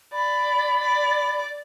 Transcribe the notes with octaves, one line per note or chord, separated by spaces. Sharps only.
D5 B5
D5